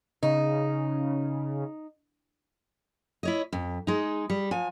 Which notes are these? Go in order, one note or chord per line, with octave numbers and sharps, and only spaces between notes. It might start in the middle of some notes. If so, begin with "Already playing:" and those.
C#3 D#4
E4 C#5 D#5
F2
G#3 D#4
G3
F3 G#5